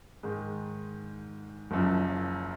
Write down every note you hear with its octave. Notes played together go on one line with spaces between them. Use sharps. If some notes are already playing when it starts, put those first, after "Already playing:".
G#2 D#3 G#3
F#1 F#2 F3